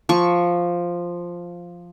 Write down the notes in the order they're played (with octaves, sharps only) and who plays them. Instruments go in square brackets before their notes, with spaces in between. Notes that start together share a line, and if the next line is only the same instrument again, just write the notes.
[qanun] F3 C#6